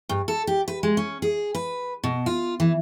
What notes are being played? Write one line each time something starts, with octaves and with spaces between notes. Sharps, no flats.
G2
A4
G4
B4
G#3
C#4
G#4
B4
B2
F4
E3